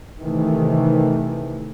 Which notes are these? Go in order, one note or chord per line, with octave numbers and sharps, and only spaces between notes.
C3 D#3 E3 A3